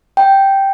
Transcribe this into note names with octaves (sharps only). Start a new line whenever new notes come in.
G5